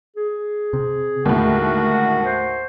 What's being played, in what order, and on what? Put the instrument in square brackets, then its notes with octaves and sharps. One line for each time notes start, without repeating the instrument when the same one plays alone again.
[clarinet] G#4
[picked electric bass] C3
[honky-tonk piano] D#2 A2 [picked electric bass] D3 G#3 [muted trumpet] F#4 [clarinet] A#4
[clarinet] C5